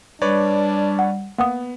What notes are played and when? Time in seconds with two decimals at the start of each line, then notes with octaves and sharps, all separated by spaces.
0.22 G3 D4 B4 C#5 D5
0.99 F#5
1.38 A#3 B3 F#5 D#6